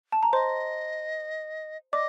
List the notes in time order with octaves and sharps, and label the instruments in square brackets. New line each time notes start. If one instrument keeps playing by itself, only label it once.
[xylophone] A5
A#5
[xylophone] C5 C6 [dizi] D#5
[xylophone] D5 D6 [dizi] D#5